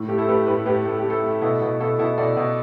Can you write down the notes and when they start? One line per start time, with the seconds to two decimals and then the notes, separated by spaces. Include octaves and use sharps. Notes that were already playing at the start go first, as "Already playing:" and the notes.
Already playing: A2
0.08 A3 G4
0.18 E4 A4
0.28 A3 G4 B4
0.47 A2 G4 B4
0.66 A2 G4 B4
0.85 A2 A4
0.98 G4
1.04 A3
1.10 E4 A4
1.23 A3
1.41 B2 E4 A4
1.61 B2
1.80 B2 E4 A4
1.99 B2 E4 A4
2.17 B2 A4 D5
2.37 B2